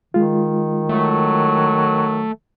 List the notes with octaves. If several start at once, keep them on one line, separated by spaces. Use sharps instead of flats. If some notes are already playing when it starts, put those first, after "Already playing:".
D#3 G#3 F4
F#3 A3